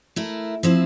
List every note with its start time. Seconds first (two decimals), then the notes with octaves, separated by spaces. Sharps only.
0.16 A3 E4 A#4
0.63 F3 C4 E4